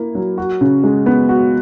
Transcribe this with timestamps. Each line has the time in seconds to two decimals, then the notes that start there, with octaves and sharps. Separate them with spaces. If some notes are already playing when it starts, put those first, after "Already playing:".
Already playing: A#3 E4 A#4
0.15 F#3
0.38 F#4
0.61 C#3
0.84 G#3
1.06 B3
1.29 F#4